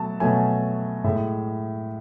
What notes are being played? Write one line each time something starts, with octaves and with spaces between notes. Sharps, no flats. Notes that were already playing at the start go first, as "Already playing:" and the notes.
Already playing: B2 F#3 A3 A5
B2 F#3 A3 G#5
A2 G#3 E5